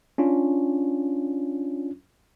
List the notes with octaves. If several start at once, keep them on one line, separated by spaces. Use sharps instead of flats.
C#4 D4 F4